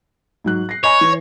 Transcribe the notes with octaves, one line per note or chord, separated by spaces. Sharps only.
G#2 F#3 F#6
A#6 C7
C#5 D#5 G#5 B5
E3